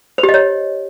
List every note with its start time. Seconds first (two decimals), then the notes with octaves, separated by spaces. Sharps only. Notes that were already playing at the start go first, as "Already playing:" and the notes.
0.18 C5
0.23 G4
0.29 D#5
0.34 C#5